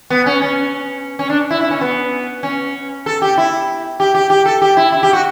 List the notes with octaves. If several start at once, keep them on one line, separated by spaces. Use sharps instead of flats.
B3
C#4
C#4
C#4
D4
E4
E4
C#4
B3
C#4
A4
G4
E4
G4
G4
G4
A4
G4
E4
E4
G4
F#4